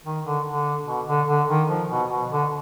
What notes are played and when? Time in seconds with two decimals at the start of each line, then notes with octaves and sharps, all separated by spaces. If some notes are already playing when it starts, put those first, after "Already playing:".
0.05 D#3
0.25 D3
0.46 D3
0.87 B2
1.07 D3
1.28 D3
1.49 D#3
1.69 F3
1.90 B2
2.11 B2
2.31 D3